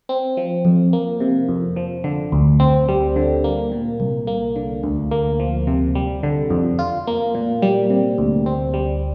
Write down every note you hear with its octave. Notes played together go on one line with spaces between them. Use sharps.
C4
F3
F2
A#3
C3
F2
F3
D3
D2
C4
G3
D3
A#3
A#2
C2
A#3
D3
D2
A#3
F3
C3
G3
D3
F2
F4
A#3
A#2
G3
C3
D2
C4
G3